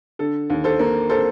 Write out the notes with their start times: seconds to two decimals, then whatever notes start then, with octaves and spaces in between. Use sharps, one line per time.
0.19 D3 A4
0.50 D#2
0.64 A4 C5
0.79 A#3
1.10 A4 C5